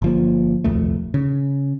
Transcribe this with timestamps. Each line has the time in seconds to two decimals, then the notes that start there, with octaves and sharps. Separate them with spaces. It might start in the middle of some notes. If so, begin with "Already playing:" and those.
0.02 G1 F3 A#3
0.64 D#1 C2 F2 A3
1.14 C#3